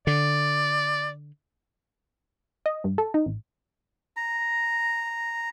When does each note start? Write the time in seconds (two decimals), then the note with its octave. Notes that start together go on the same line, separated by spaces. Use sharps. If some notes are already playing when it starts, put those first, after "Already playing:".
0.07 D3 D5
2.66 D#5
2.84 G2
2.98 A4
3.14 D#4
3.26 A1
4.16 A#5